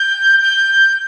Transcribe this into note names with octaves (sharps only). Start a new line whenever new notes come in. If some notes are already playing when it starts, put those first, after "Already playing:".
Already playing: G6
G6